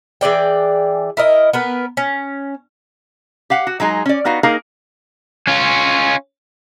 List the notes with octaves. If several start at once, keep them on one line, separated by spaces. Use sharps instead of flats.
E3 G#4 D5 G5
E4 A#4 D#5
B3 A#4 B4
C#4
G4 F5 F#5
F#4
F#3 G#3 D#4 G#4
C#4 D5
B3 D#4 F#4 F5
A#3 D#4 G#4 A#4 F5
C#4 F4